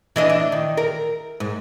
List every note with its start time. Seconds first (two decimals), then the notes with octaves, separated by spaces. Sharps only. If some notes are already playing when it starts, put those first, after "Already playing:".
0.16 E3 D4 D#5
0.30 D4
0.52 D#3
0.77 A#4
1.40 G#2